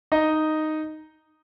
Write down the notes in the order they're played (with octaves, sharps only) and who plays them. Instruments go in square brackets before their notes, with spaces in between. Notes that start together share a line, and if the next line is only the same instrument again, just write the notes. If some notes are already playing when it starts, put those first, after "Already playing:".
[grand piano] D#4 D#5